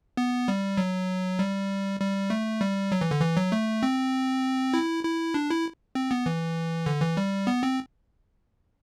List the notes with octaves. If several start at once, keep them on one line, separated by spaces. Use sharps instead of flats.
B3
G3
F#3
G3
G3
A3
G3
F#3
E3
D3
E3
F#3
A3
C4
E4
E4
D4
E4
C4
B3
E3
D3
E3
G3
B3
C4